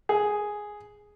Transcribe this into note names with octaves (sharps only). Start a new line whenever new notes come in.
G#4